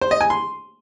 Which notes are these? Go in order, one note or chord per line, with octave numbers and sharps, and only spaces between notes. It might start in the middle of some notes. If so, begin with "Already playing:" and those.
C5
D#5
G#5
C6